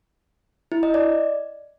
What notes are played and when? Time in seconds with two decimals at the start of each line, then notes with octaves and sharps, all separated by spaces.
0.72 E4
0.83 D#5
0.94 D5